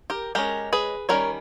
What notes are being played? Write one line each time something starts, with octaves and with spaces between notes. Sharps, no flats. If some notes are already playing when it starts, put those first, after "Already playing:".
G4 A#4
G#3 C#4 G4 A#4
G#4 B4
D#3 G3 C#4 A#4 C#5